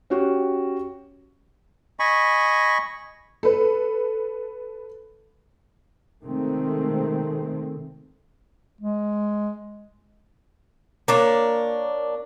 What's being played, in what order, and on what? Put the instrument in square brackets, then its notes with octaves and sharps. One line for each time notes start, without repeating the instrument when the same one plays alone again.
[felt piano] C#4 F#4 G4
[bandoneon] D#5 G#5 B5 C#6
[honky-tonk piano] A4 B4
[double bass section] C3 D#3 G#3 A3 C4
[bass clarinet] G#3
[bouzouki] A#3 D4 C#5